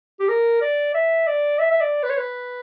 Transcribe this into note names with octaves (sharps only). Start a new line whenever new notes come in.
G4
A#4
D5
E5
D5
E5
E5
D5
B4
C#5
B4